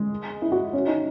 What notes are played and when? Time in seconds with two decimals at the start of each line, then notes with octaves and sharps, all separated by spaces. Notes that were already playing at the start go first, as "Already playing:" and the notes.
Already playing: G#3
0.42 E4
0.52 F#4
0.73 C#4
0.87 D#4